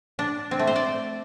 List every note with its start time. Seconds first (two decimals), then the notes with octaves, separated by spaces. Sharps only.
0.19 D4
0.51 C4
0.59 A3
0.67 C5
0.76 D5